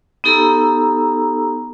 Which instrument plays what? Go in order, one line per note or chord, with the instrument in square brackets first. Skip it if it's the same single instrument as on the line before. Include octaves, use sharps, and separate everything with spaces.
[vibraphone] B3 D#4 G4 A4 A#5 E6